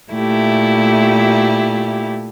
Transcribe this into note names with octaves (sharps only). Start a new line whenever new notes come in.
A#2 A3 E4 G4